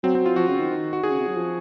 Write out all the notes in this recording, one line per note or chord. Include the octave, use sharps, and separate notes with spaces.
F#3 C4
C4
F4
F3 F#4
C#3
D#3
D#3
F#4
D#3 G#4
C#3
C3
F#3
F3